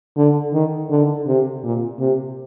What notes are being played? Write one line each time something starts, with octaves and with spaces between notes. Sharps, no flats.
D3
D#3
D3
C3
A#2
C3